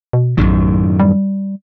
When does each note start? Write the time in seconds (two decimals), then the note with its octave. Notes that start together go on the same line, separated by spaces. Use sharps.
0.13 B2
0.37 A#1 F#2 A2 D#3
1.00 G3